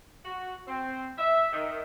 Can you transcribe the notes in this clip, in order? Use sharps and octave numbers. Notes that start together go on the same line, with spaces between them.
F#4
C4
E5
D#3